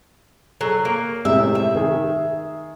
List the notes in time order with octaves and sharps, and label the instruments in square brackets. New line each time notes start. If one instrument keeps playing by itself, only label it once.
[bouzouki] F#3 G#4 [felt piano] A4
[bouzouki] A#3
[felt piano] A2 C3 G#3 [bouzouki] E5
[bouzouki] E5
[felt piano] D#3 G#4